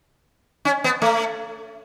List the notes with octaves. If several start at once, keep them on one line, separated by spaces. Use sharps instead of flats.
C#4
B3
A3